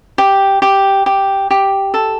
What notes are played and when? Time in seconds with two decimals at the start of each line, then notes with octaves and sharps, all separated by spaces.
0.18 G4
0.62 G4
1.06 G4
1.51 G4
1.94 A4